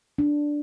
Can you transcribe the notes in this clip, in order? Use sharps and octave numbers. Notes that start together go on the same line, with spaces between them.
D4